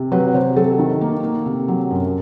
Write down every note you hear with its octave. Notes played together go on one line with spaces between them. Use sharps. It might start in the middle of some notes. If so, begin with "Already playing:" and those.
Already playing: C3
F#3 B4
C3 C5
F#3 A4
D#3
A#3
A#3
C3
F#3
F#2